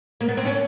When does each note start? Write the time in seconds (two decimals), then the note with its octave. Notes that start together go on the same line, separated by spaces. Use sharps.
0.21 A#3
0.28 B3
0.37 C4
0.45 C#4